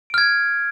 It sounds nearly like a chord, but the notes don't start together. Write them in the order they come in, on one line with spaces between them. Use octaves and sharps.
D7 F6 G#6